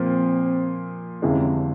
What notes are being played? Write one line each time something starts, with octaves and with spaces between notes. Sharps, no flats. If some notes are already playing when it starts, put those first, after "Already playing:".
Already playing: A#2 F3 A#3 C4
G1 F2 C3 E3 G#3 C#4